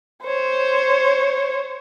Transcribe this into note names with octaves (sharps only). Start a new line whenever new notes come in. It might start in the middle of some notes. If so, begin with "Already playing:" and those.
C5 C#5